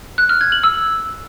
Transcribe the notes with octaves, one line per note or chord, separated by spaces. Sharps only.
F#6
F6
G#6
F#7
E6